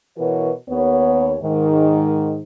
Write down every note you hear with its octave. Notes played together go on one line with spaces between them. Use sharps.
B2 E3 F#4 A#4 B4 C#5
D#2 B3 C#5
G#2 D#3